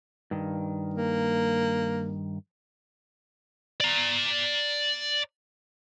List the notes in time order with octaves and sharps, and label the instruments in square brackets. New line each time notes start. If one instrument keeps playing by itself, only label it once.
[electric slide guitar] G2 D#3
[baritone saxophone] A#3
[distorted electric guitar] D5 A#5